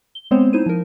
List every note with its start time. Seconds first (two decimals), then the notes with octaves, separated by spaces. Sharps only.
0.15 G7
0.31 G#3 B3 C4 C5 C#5
0.53 D#4 E4 C5 D#7
0.66 F3 A#4